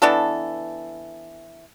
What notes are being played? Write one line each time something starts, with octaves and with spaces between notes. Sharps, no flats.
E3 B3 D4 A4